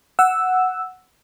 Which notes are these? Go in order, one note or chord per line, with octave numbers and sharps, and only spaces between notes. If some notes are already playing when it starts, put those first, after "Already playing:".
F#5 E6